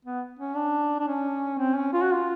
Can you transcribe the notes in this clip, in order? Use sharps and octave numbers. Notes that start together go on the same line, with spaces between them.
B3
C#4
D4
D4
C#4
C4
C#4
F4
F#4
F4